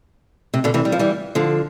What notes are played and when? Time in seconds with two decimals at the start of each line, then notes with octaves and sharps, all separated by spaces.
0.54 C3
0.64 B2 D3
0.74 C3 E3
0.85 G3
0.92 F3
0.99 E3 G3
1.35 D3 F3